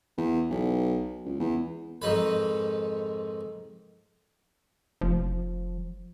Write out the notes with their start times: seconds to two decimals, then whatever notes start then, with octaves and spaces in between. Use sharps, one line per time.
0.18 E2
0.50 B1
1.25 C#2
1.40 E2
2.02 F2 G#2 D#3 B4
5.01 F1 F3